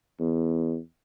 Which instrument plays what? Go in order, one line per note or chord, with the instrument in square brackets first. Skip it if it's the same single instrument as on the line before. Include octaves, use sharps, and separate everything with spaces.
[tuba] E2